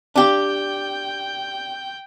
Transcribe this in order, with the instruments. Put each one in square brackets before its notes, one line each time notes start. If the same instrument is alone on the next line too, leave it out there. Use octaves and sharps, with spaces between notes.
[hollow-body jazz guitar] D4 G4 [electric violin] G5